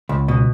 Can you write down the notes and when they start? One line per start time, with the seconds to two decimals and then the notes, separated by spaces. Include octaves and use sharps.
0.09 C#2
0.28 B2